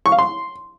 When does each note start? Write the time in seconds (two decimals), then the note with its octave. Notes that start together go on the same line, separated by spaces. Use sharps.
0.06 C#6
0.12 F5
0.19 C6